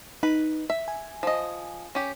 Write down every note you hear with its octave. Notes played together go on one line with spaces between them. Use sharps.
D#4 B4
E5
G#5
F3 D#5
C#4 G4